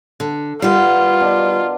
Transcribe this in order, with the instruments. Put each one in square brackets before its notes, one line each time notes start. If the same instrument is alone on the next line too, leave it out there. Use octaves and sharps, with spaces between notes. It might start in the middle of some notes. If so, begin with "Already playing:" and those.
[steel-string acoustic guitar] D3
[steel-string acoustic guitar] G3 B4 [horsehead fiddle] F4 [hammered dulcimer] A#4 F#5
[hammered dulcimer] B2 D4